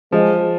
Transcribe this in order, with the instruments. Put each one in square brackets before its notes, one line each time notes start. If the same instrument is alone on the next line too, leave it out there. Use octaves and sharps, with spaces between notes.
[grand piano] F3 [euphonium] G#3